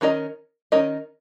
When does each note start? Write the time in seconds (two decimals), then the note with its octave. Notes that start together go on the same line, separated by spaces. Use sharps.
0.01 D#3 C#4 A#4 D#5
0.72 D#3 C#4 A#4 D#5